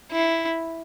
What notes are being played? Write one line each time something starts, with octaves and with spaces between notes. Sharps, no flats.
E4